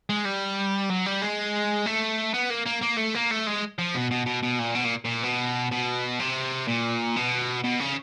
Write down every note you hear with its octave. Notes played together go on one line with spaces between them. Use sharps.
G#3
G3
F#3
G3
G#3
A3
B3
A#3
A#3
A#3
A3
A#3
A3
G#3
F3
B2
B2
B2
B2
A#2
B2
A#2
A#2
B2
B2
C3
A#2
B2
B2
C#3